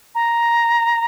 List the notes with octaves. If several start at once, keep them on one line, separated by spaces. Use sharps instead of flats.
A#5